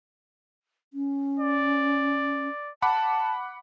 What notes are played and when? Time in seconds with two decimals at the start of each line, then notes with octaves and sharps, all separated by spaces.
0.93 C#4
1.40 D5
2.82 F#5 A5 B5 D6